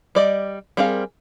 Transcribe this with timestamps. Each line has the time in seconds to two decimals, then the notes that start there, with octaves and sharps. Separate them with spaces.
0.15 G3 D5 D#5
0.77 G3 C4 G#4 A#4 F5